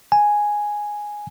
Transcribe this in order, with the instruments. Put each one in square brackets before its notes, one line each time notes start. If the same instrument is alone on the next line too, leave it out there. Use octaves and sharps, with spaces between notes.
[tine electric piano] G#5